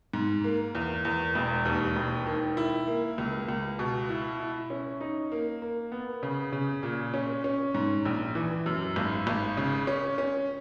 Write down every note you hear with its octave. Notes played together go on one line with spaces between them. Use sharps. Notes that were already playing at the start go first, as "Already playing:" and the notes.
G#2
A#3
E2
E2
E1
D#2
E1
D#3
E4
A#3
C#2
C#2
B2
E4
E4
C#4
D#4
A#3
A#3
B3
C#3
C#3
A#2
C#4
C#4
G#2
A#1
E3
F#2
G#1
G#1
C#3
C#4
C#4